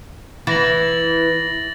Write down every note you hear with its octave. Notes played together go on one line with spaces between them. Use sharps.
E3 A6 A#6 F#7